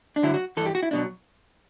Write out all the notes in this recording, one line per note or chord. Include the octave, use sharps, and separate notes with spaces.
D4
G2 D3 F#3 E4
F#4
G2 E3 A4
G4
F#4
E4
B2 F#3 D4